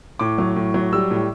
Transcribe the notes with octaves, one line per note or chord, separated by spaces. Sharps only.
A2 D6
F#3
A2
F#3
G3 E6
A2